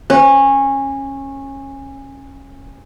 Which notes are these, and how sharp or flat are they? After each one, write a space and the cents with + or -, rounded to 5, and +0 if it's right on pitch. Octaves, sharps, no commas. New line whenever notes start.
C#4 -20